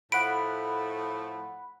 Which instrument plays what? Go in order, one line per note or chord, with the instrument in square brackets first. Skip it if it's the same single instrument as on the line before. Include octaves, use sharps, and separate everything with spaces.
[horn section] A2 F3 A3 [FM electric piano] F#5 B5 [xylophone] D7